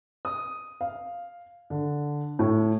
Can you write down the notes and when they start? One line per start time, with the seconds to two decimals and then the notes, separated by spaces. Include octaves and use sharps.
0.25 D#6
0.81 F5
1.70 D3
2.39 A2